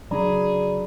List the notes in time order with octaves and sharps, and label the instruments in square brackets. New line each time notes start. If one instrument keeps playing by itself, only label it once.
[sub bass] C#3 [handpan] F#3 D4 [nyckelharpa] G#4 [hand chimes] D5 A#5 B5